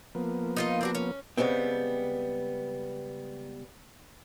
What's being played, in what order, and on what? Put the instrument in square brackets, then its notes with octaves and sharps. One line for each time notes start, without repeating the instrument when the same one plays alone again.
[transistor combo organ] F3 A#3 B3
[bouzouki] D#4 F4 D#5
C4 D4 F#4
C#4
[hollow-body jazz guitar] C#3 G3 G#3 B3 C4